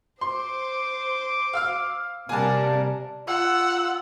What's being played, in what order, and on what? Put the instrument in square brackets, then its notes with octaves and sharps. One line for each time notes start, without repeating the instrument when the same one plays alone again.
[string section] C5 [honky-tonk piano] C6 [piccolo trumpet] D6
[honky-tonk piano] F5 E6 F6
[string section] C3 G3 A#4 [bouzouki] A#3 D4 [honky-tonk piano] G#5 A5
[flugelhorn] F4 [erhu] F#5 [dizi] E6